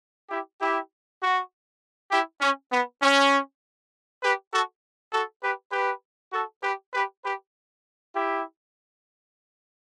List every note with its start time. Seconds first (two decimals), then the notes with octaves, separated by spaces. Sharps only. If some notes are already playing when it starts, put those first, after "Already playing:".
0.30 E4 G4
0.60 E4 G4
1.22 F#4
2.11 E4 G4
2.41 C#4
2.72 B3
3.02 C#4
4.23 G4 B4
4.52 F#4 A4
5.12 F#4 A4
5.42 G4 B4
5.72 G4 B4
6.33 F#4 A4
6.63 G4 B4
6.93 G4 B4
7.24 G4 B4
8.14 E4 G4